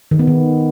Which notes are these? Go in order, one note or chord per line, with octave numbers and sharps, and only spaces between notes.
D#3
B3
D#3